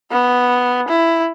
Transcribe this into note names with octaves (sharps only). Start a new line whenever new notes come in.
B3
E4